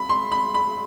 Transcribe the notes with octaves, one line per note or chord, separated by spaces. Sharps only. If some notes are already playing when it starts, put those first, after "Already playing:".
Already playing: B5
C6
B5
B5